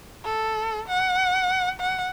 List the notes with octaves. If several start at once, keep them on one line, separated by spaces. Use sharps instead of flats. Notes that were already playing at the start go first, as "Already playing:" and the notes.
A4
F#5
F#5